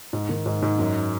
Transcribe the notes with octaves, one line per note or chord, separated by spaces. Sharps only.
G#2
D#3
G#2
G#2
F#2